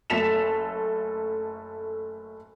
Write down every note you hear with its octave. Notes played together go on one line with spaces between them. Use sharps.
F#1 A3 A4 B6 E7 F7